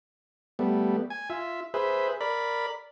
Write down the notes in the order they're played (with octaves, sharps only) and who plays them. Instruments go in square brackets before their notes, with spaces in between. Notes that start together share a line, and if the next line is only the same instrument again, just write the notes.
[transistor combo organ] G3 A3 B3
G#5
F4 E5
G#4 B4 C5 E5
A#4 D5 B5